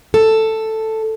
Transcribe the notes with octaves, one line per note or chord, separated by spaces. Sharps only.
A4